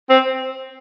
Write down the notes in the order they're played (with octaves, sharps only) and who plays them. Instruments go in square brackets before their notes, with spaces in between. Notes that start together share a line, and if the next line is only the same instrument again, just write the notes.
[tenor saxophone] C4